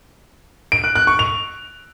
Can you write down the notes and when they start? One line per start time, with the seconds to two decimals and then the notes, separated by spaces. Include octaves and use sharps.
0.72 D7
0.84 F#6
0.96 F#6
1.07 C#6
1.19 F7